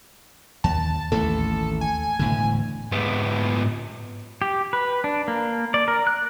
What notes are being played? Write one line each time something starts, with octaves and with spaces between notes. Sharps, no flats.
D#2 A5
A1 D#2 A3 A4
G#5
E1 A2 D3
G#2 B3
G4
B4
D4
A#3
D5
A#4
F#6